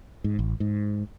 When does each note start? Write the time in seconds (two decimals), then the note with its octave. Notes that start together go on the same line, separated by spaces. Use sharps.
0.24 G#2
0.39 A1
0.60 G#2